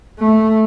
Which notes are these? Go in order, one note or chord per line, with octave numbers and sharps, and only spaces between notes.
A3